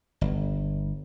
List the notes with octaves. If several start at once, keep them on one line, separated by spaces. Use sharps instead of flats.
G1